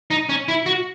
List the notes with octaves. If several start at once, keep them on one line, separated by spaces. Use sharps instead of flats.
D#4
C#4
E4
F#4